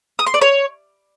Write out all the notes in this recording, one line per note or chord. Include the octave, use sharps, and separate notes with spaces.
D#6
C6
D5
C#5